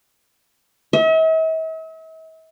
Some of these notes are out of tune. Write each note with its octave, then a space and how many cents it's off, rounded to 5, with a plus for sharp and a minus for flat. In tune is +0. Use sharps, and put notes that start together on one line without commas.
E5 -45